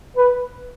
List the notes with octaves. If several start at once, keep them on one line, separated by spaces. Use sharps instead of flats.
B4